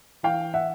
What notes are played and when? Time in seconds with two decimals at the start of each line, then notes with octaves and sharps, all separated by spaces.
0.23 E3 F5 G5
0.54 E5 F#5